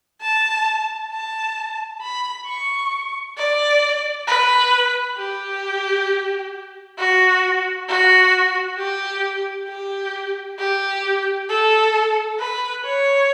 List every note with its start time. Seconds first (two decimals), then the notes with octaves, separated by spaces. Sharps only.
0.21 A5
1.12 A5
2.02 B5
2.47 C#6
3.37 D5
4.27 B4
5.17 G4
6.98 F#4
7.89 F#4
8.79 G4
9.69 G4
10.59 G4
11.49 A4
12.39 B4
12.85 C#5